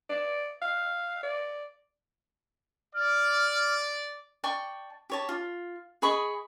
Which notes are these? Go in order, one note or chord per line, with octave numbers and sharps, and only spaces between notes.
D5
F5
D5
D5 F6
D5 G5 A5 C#6
G4 C#5 A5
F4
G#4 D#5 B5 C#6